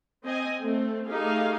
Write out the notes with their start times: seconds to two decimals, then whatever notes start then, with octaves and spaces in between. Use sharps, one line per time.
0.23 C4 D#5 G#5
0.61 A3 C4
1.08 A3 D#4 G4 G#4 F5